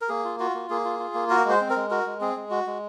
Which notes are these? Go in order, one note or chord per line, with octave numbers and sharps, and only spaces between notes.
A#4
A#3 G#4
F4
F4 F#4
A#3
A#3 G#4
F4
F4
A#3
F#4 A#4
G#3 C5
C4
A#4
G#3
F#4 A#4
G#3
C4 G#4
G#3
F#4
G#3